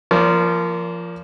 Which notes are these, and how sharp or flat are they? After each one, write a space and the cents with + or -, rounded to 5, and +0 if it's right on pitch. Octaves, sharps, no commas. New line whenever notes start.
F3 -20 A#3 +0 D5 -45